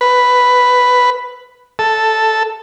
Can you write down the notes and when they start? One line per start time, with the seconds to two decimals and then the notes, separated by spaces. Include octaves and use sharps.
0.01 B4
1.79 A4